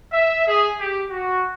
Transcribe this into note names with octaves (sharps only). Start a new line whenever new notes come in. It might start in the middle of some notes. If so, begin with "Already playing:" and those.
E5
G#4
G4
F#4